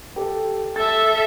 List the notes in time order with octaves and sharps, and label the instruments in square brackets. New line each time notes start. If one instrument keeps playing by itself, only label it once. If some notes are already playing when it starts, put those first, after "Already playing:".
[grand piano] G4 A4
[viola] A4 E5 [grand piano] A6